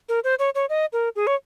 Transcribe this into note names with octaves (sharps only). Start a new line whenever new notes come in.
A#4
C5
C#5
C#5
D#5
A#4
G#4
C#5